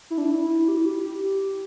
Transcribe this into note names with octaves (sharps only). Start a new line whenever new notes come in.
E4
D4
E4
G4
E4
G4